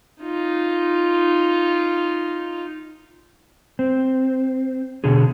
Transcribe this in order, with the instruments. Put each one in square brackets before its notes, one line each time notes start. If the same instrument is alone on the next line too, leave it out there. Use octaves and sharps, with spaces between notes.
[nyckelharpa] D#4 F4
[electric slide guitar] C4
B2 D3 G#4